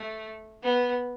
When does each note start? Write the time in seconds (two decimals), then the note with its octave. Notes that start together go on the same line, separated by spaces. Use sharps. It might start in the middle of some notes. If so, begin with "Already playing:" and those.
Already playing: A3
0.63 B3